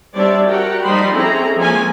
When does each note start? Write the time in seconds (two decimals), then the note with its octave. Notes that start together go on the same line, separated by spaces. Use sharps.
0.15 G3 C4 D4 C#5 D5 E5
0.47 F#4 G4 A#4 F#5 G5
0.85 F3 G3 D#4 C5 B5 C6
1.14 C4 C#4 E4 G#4 A4 A#5
1.56 F3 G#3 A#3 C4 C#4 G#5